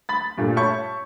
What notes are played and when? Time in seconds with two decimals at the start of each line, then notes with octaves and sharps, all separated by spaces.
0.09 B5 A6
0.38 G2 A#2 A3
0.56 C#5 E5 A5 B5 C#6 G6